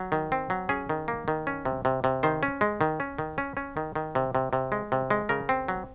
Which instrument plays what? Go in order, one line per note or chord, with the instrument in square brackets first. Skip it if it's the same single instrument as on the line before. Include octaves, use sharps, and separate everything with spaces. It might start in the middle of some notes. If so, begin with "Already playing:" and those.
Already playing: [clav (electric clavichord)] F#3
D#3
C4
F#3
C#4 G#4
D#3
A#3
D#3
C#4
C3
C3
C3
D#3 C5
C#4
G#3
D#3
C#4
D#3
C#4
C#4
D#3
D#3
C3
C3
C3
G#3
C3
G#3
C#3 A#4
C4
F#3